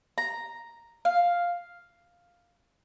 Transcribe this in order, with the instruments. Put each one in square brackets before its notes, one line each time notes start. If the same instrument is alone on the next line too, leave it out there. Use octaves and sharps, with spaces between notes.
[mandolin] A#5
F5